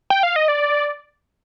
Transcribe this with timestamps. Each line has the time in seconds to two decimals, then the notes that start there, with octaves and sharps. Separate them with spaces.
0.10 G5
0.23 F5
0.36 D#5
0.48 D5